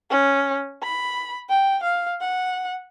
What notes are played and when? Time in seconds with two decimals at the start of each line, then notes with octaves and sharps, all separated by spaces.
0.10 C#4
0.83 B5
1.49 G5
1.83 F5
2.21 F#5